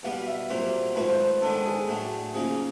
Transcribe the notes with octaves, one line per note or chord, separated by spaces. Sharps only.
E2 B2 G3 B3 F5
E5
C2 A#2 F#3 A#3 C5
G#2 F3 A3 C4 B4
C5
B4
D#3 G#3 B3 D4 A4
G#4
A2 F#3 A3 D4
C#3 F3 A#3 D#4 G#4